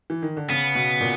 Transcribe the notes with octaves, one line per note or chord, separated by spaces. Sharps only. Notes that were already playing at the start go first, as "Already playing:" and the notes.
E3
D#3
D3
C#3 B3
B2
A#2